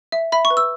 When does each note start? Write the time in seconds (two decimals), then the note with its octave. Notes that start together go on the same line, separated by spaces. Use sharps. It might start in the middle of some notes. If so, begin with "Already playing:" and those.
0.12 E5
0.32 E5 B5
0.45 C#6
0.50 B4
0.57 E6